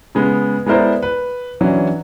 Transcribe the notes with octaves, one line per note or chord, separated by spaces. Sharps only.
C#3 G#3 B3
G#3 B3 E4 A#4 C5 D5
B4
E3 F#3 C#4 D4